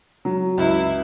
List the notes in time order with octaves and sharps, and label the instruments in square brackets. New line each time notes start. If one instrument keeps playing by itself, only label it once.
[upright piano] F#3
[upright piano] C#2 [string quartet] E4